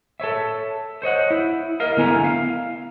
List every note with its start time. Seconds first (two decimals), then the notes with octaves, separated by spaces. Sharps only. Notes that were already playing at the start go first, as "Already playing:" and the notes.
0.20 A4 C5 C#5 E5
1.02 C5 C#5 D#5 F#5
1.30 E4
1.80 A#4 D#5 F5
1.97 D3 A3 B3 E4 G#5 A#5
2.25 F5